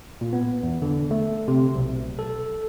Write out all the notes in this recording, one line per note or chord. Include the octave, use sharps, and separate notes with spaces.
A#2
B3
E2
D3
A3
C3
B1
A4